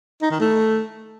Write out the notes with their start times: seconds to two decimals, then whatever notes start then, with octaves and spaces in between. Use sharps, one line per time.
0.22 D#4
0.31 D#3
0.40 A3